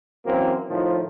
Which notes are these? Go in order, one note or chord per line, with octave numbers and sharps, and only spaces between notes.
F#2 E3 A#3 C4
A2 D#3 F3